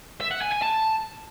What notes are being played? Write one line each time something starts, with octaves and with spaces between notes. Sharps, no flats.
E5
F#5
G#5
G#5
A5